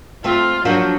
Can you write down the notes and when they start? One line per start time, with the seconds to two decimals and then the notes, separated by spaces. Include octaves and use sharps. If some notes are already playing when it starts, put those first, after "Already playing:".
0.24 A3 C4 F4
0.65 F3 F#3 A#3 D4